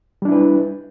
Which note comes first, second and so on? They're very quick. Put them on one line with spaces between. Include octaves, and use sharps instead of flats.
G3 D4 E4 B4